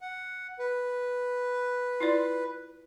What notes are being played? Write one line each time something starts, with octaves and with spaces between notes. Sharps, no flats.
F#5
B4
E4 F4 D5